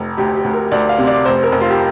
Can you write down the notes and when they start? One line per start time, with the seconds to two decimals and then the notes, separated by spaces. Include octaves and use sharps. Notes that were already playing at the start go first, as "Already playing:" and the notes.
Already playing: F1
0.17 D2 G4
0.35 G4
0.44 D2
0.53 A#4
0.72 D2 D5
0.89 F5
0.98 C3
1.07 D5
1.25 F1 C5
1.43 A#4
1.52 F1
1.61 F4
1.70 G4